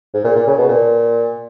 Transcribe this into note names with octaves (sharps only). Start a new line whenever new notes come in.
G#2
A#2
A#2
C#3
B2
A#2